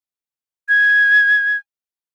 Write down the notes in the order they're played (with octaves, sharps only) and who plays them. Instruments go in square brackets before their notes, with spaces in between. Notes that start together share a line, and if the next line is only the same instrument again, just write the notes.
[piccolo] G#6